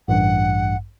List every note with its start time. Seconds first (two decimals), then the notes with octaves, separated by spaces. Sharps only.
0.08 A1 G2 F#5